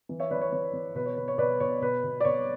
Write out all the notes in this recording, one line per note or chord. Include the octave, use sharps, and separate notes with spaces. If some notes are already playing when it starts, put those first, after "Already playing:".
E3
C#5 E5
E3 B4 D5
C#5
E3 C#5
E3
B2 B4
C#5
B2 B4
C#5
B2 B4 D5
B2 C#5
B2 B4
B2
D5
B2 C#5